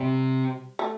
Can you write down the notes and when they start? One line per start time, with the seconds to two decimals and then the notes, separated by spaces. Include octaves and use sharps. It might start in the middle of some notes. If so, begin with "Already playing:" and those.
Already playing: C3 G3
0.79 A3